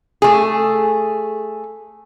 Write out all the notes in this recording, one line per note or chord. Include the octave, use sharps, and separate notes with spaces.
A3 G#4